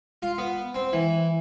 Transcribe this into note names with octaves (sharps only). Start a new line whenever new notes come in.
F4
B3
C4
E3